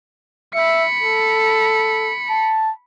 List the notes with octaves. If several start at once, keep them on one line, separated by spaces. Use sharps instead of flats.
E5 B5 C#7
A4
A5